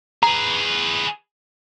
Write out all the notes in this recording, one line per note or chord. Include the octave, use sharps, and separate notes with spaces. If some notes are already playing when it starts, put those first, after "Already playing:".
G#4 B4 A#5